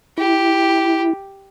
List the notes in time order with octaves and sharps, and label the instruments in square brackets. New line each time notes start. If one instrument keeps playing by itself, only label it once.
[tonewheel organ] E4 [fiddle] G4